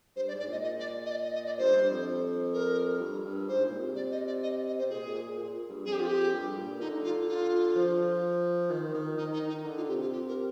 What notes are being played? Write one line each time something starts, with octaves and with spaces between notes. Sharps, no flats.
G2 C5
D5
G#2
D5
A#2 D#5
D#5
D5
D#5
D5
D#5
D#5
D5
G2 C5
G2
F2
A#4
G2
G2
G#2 C5
A#2
C3
D5
D#5
D5
D#5
D#5
C5
C3
A#2 G#4
A#2
A#2
G2
F2 G#4
G4
F4
G4
G2
A#2
D3 D#4
F4
F4
F3
D#3
D#3
D#3 D#4
D#4
D#3
D#4
D3
F4
C3 G4
F4
G4
A#4